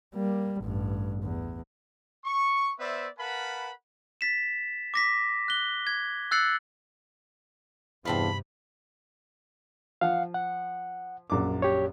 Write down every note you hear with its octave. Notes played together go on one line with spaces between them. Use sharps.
G3 A#3
A1 G2
E2
C#6
B3 B4 C5 D5 E5
A#4 B4 F5 F#5 A5 B5
A6 B6 E7
D6 A#6 B6
F#6 G7
G#6
E6 F#6 A6 C7 C#7 F#7
E2 G2 C3 C4 D4 F4 B5
F3 F5 F#5
F#5
A#1 F#2 D6
G4 C#5